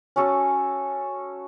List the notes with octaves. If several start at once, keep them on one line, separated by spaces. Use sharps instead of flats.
C#4 F#4 A4